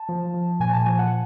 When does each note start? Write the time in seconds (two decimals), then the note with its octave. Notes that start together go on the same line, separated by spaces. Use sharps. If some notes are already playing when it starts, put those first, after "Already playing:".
Already playing: A5
0.09 F3
0.34 F3
0.60 A#2 G#5
0.73 A5
0.86 F3 G#5
0.99 F#5